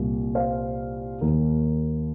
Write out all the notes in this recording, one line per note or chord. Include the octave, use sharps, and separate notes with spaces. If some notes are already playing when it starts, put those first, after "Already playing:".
Already playing: C2 A#2 G3 A#3
C5 F5
D#2 D#3 A#3